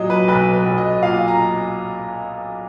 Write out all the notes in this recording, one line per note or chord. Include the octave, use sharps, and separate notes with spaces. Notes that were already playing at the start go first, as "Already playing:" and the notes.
Already playing: A#2 F#3 D#5
B4
B1 B4
B4
B1
D#5
A#2 F5
A#5